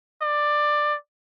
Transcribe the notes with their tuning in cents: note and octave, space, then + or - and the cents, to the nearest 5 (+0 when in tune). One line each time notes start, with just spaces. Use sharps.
D5 +15